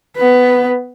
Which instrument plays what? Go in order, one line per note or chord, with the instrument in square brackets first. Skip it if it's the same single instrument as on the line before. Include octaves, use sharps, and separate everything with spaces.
[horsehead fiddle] B3 B4